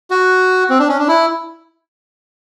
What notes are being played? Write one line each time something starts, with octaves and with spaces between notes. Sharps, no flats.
F#4
C4
D4
C#4
D4
E4